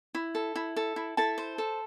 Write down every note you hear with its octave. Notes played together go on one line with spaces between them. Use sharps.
E4
A4
E4
A4
E4
E4 A4 A5
C5
A4